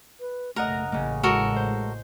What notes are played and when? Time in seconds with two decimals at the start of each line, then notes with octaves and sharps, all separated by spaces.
0.20 B4
0.56 F#1 B1 C#3 A3 A#4 D#5 F#5 A#5
0.92 A1 A2 C#3 A#3 D#5
1.23 G#3 F#4 A4 A#4
1.56 C5